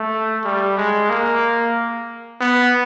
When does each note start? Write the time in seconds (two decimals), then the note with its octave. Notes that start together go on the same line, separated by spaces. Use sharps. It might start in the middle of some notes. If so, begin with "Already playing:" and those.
Already playing: A3
0.45 G3
0.78 G#3
1.10 A#3
2.41 B3